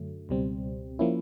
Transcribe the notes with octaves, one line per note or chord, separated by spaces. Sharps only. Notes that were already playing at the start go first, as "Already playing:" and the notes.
Already playing: F#2 D3 F#3 A3
C#2 B2 G3 C4
F3 A#3 C#4 E4